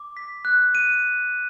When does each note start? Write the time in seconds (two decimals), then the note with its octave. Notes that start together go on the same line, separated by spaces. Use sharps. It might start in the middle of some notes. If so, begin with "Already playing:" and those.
Already playing: D6
0.17 B6
0.45 F#6
0.75 D#7